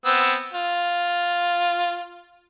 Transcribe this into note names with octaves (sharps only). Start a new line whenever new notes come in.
B3 C4 E6
F4